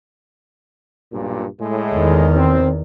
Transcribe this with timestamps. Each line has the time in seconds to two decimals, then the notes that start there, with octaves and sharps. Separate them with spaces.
1.12 B1 G2 A#2
1.60 A2 G#3
1.94 E2 D#3
2.35 C4